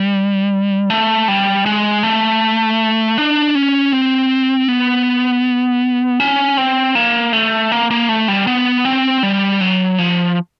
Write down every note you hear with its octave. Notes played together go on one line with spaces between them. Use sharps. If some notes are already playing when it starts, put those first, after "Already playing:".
Already playing: G3
A3
G3
G#3
A3
D4
C#4
C4
B3
C#4
C4
A#3
A3
A#3
A#3
A3
G3
B3
C4
G3
F#3
F3